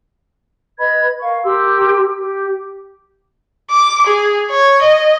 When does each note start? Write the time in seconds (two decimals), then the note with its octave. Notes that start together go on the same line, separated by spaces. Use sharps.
0.79 B4 D#5 B5 G#6
1.21 A#4 F5 C#6
1.45 G4 A#4 C6 E6
2.18 G4
3.71 D6
4.07 G#4
4.51 C#5
4.82 D#5